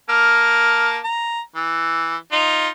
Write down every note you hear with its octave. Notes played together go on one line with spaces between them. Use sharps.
A#3 A5 F6
A#5
E3
D#4 F4